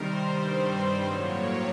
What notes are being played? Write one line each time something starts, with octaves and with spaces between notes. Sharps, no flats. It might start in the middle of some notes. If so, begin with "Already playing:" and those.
Already playing: C3 D#3 G3 A#4 C5
G2 D#3 G3 C4 C5
A2 F#3 A#3 C#5